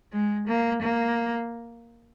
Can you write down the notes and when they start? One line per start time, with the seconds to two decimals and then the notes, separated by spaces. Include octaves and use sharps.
0.13 G#3
0.48 A#3
0.82 A#3